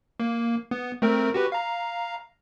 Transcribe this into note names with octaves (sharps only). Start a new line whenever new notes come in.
A#3
B3
A3 C4 A#4
F#4 G4 B4
F5 A#5